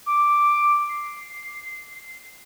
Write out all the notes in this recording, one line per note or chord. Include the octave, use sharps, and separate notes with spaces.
D6
C7